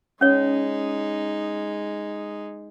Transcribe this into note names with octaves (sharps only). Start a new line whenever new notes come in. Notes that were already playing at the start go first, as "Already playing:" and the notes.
G#3 C#4 D#4 C#5